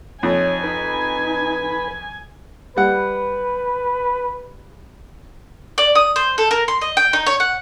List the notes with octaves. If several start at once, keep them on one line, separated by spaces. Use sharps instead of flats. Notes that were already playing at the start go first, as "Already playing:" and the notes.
F2 D#4 C#5 G#5
D#4 B4 B5
G3 B4 F#5
D5
D#6
C5
A4
A#4
C6
D#5
G5
D#4
C#5
F#5